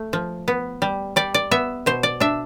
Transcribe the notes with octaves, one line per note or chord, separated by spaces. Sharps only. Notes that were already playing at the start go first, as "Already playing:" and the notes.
Already playing: A3
F3
B3
G3
G3 D5
D5
B3 E5
B2 C5
D5
D4 E5